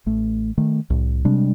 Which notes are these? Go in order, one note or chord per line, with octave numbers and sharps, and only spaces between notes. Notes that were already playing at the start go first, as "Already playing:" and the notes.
A1 A3
D#3 A3
C2 A2
C3 G3 G#3 D4